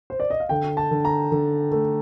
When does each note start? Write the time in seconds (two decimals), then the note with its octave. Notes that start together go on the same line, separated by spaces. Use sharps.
0.10 C5
0.20 D5
0.30 D#5
0.40 F5
0.49 D3 G5
0.77 A5
0.91 D3
1.05 A#5
1.32 D3
1.72 A3